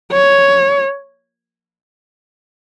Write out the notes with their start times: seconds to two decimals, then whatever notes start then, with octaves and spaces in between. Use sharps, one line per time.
0.12 C#5